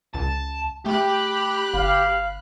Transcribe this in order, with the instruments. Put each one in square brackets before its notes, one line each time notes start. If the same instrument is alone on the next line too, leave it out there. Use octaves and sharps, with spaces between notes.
[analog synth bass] C#2 [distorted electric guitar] A5
[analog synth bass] A3 [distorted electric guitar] G4 [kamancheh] B5 F#6
[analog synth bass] G1 [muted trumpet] F5